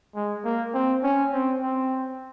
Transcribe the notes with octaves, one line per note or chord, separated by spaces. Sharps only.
G#3
A#3
C4
C#4
C4
C4